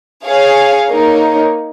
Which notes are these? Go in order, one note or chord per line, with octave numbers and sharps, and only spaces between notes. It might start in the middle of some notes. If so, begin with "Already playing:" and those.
G#4 C#5 F5 G#5
A#3 D#4 A#4 C#5